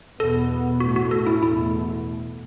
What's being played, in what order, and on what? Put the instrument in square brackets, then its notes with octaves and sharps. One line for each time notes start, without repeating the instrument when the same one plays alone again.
[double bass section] E2 B2 B3 [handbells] A4
[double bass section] A2 A3 [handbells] F#4
[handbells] F#4
A4
E4
[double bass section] E2 B2 A3 [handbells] E4